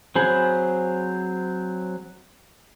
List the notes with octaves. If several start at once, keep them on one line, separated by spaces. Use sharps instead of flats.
F#3 C4 G#4 C5 B5